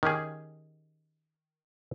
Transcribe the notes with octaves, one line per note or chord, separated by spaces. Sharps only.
D#3 C#4 G4 G#4